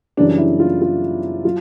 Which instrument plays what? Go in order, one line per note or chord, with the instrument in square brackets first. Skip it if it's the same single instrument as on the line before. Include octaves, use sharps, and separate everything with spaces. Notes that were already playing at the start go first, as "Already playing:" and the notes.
[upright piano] F#2 C#3 E3 G3 D4
E4
F4
F4
F#3 F4